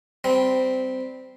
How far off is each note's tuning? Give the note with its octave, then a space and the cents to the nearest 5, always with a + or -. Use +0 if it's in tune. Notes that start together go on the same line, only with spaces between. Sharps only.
G3 +0 C4 -15